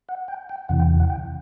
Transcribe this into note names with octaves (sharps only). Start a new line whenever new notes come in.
F#5
G5
G5
E2 C3 E3 F#5
G5
F#5
G5